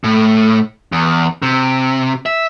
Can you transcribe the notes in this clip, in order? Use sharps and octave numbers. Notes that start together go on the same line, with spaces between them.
A2
E2
C3
E5